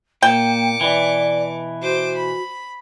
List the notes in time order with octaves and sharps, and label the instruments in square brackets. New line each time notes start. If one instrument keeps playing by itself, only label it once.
[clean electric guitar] A#2 [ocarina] A#3 [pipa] G5 [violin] D6 C#7
[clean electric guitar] B2 E3 [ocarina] D5
[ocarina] F#4 [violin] C5 D6
[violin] B5